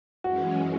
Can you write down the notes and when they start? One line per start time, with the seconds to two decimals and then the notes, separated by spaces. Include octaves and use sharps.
0.24 F#2 E3 G#3 C#4 F#4